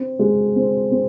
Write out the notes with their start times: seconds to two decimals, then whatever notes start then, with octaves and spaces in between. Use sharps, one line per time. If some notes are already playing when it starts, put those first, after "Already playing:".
Already playing: C4
0.19 G#3
0.56 C4
0.91 C4